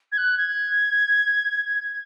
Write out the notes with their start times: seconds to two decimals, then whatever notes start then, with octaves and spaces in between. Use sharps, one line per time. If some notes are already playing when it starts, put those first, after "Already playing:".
0.12 G#6
0.17 F#6
0.37 G#6